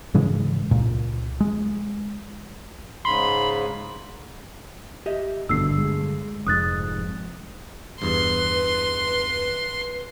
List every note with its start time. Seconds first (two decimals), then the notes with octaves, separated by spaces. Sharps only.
0.14 G#2 C#3 E3 G#3
0.71 C#2 A#2
1.40 G#3
3.05 G#2 C#3 B5 C6
5.06 G4 D#5 E5
5.49 G#1 G2 B2 D3 A3 E6 C7
5.78 G#3
6.47 F1 F2 G#2 D#6 F#6 A6
8.02 E2 G2 B4 C6